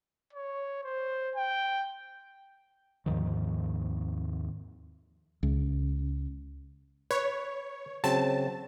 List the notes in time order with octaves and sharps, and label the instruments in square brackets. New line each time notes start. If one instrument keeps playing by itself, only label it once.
[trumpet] C#5
C5
G5
[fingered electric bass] D#2 G#2 D#3 F3
[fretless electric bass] C#2
[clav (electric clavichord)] B4 [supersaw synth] C#5
[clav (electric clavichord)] C#3 F#3 C4 [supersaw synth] A5